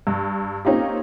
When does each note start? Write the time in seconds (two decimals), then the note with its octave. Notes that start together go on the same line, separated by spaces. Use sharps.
0.07 G2
0.65 A#3 C4 C#4 D#4 F4 G4